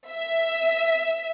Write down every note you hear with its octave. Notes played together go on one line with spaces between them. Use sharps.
E5